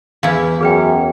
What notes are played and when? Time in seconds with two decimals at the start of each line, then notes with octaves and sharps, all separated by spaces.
0.23 E2 E4 B4 F5
0.61 F#2 G#4 B4 G5